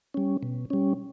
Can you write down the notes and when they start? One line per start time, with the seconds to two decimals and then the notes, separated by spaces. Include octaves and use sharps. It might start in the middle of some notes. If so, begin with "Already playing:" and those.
0.14 G3 C#4
0.43 B2
0.70 G3 C#4